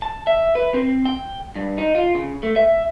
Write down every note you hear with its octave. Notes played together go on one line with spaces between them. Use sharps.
A5
E5
B4
C4
G5
G2
D#4
F4
C#3
A3
E5